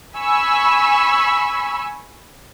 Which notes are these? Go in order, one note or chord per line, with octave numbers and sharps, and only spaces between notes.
G#5 B5 C#6 E6